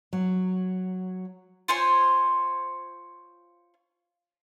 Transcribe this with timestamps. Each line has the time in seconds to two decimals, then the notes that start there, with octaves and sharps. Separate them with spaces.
0.13 F#3
1.68 F4 C5 C#5 G#5